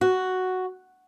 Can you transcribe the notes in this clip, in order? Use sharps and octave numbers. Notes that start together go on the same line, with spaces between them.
F#4